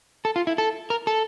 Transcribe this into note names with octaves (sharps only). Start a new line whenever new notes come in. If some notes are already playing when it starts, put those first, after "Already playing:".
A4
F4
E4
A4
A#4
A4